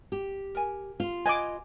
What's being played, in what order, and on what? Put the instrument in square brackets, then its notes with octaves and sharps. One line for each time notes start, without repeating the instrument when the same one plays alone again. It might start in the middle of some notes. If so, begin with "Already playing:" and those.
[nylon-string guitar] G4
[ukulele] A#4 G#5
[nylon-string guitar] F4
[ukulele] B4 D#5 [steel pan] G#5 D6